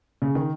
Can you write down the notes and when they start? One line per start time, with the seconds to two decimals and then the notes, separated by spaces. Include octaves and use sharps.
0.22 C#3
0.35 D#3